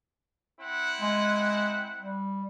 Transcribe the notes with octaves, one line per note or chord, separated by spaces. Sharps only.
C4 E4 F#5
G#3
G3